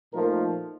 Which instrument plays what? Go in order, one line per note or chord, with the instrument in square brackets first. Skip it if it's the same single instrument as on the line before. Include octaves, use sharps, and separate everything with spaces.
[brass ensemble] A#2 F3 A3 D#4 A#4